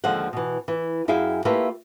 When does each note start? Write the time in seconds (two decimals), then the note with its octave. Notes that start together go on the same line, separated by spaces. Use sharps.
0.04 D#2 D3 F3 G#3 C5 F#5
0.33 B2 E3
0.68 E3
1.08 F#2 E4 G#4 F5 G5 G#5
1.45 A3 A#3 E4 F4 G4 B4